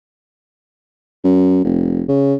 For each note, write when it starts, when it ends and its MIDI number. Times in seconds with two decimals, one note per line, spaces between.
1.24 1.62 42
1.64 2.03 29
2.08 2.34 49